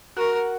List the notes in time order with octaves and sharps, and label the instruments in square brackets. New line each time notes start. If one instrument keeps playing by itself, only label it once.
[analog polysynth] F#4 [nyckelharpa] A#4